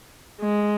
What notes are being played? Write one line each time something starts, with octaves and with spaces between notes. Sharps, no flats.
G#3